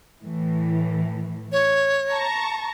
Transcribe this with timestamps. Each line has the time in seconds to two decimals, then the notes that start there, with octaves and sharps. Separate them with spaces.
0.22 A2 E3
1.52 C#5
2.10 A5 A#5 C#6